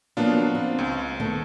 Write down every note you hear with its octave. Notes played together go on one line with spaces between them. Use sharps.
F3 F#3 A#3 B3 D4 F4
C4
C#2
D#3 A3 B3